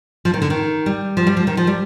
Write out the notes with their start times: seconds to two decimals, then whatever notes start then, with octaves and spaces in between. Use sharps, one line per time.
0.25 F3
0.34 D#3
0.42 D3
0.50 D#3
0.86 G3
1.17 F3
1.27 G3
1.37 F3
1.47 D#3
1.57 F3
1.67 G3